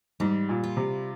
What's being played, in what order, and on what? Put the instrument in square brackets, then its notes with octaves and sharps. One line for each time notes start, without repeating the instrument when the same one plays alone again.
[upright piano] G#2 [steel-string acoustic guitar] G3
[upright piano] A#2
[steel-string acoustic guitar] F4
[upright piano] C3